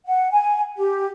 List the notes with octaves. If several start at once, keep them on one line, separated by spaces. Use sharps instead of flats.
F#5
G#5
G4